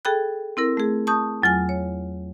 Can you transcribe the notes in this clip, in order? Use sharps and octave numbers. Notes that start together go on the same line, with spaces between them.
G#4 A4 G5 B5 F#6
C4 E4 A#4
A3 G#4
A5 C#6 D#6 G6
E2 F#3 F4 G#5
C#5